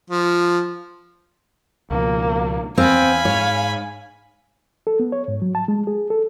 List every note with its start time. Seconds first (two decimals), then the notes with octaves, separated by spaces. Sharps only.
0.10 F3
1.90 C#2 B2 F3 A#3
2.78 E2 C4 F5 G#5 B5
3.25 G#2 C#5
4.87 A4
5.00 B3
5.12 C#5
5.28 G#2
5.42 F#3
5.55 A5
5.68 G#3
5.87 G#4
6.10 A4